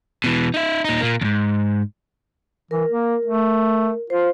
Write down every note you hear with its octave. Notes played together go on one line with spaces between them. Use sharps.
B2 E3
D#4 E5
A#2 D#4
A#2 A#3
E2 G#2
E3 A#4
A#3
A3
F4 C5